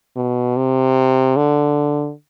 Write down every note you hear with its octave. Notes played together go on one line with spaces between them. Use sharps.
B2
C3
D3